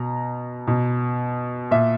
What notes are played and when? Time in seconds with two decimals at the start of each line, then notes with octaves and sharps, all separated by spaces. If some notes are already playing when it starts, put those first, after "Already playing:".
Already playing: B2 A#5
0.67 B2
1.71 A#2 E5